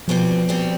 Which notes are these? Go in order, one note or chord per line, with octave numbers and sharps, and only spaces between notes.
B2 F3 G3 C4
B2 G3 C4